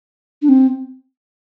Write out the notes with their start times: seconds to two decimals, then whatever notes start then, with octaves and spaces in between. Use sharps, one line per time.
0.42 D4
0.49 C4